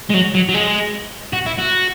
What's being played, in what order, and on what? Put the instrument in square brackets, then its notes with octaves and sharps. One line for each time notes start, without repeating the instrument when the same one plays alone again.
[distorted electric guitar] G#3
F#3
F#3
F#3
G#3
F#4
E4
F#4